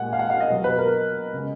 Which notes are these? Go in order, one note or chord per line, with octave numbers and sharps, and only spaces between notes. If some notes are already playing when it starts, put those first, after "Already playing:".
Already playing: A#2 G#3 F#5 G#5
F5
F#5
F5
D#5
B2 F#3
B4
A#4
C#3 G#3